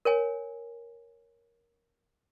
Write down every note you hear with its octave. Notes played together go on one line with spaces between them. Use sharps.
A#4 C#5 G#5